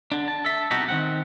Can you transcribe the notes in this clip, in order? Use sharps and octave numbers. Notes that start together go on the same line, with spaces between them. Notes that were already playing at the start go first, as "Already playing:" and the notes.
D3 D4
A5
A4 E5
C2 B2 D#4 F#4 G4
D#3 C4 F#5